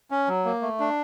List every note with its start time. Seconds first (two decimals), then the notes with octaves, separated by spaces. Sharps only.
0.11 C#4
0.28 F#3
0.45 A#3
0.62 A3
0.80 D4